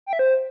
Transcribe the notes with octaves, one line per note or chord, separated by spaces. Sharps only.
G5
E5
C5